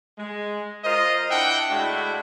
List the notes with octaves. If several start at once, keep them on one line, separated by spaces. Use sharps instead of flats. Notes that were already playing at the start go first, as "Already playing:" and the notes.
G#3
F4 A#4 C5 D#5
D4 E4 E5 F#5 G5
A2 G#3 D4 E4 F#4